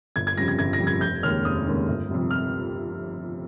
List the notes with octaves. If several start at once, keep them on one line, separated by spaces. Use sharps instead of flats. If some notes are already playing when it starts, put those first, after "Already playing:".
G1 G#6
G#6
F2 C#3 G3 A#6
G#6
G1 G#6
A#6
F2 C#3 G3
G#6
F1 G6
D#2 C#3 G#3 C#4 F6
F1 D#6
D#2 C#3 G#3 C#4
G1
F2 C3 G3
F6